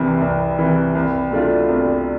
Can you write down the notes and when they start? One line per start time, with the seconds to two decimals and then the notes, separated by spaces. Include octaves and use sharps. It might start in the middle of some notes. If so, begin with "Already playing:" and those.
Already playing: C2 C3 E3
0.21 C2
0.58 C3 E3
0.95 C2
1.31 B2 A3 D4 F4
1.68 C2